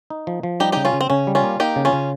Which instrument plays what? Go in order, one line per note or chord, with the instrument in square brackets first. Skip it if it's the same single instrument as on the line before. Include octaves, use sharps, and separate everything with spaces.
[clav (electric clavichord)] D#4
F3
F3
[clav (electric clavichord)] G3 [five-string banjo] D#4 G4
[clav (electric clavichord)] C#3 [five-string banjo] D#4 G4
[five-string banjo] C#4 F4
[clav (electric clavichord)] C#3
[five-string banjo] C4
[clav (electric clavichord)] C#3 [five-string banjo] C#4
[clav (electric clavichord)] G3
[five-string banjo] C#4 F4
[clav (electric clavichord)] A#3
[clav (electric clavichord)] A#3 [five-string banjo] D#4 G4
[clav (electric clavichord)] C#3
[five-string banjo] C#4 F4
[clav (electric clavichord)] C#3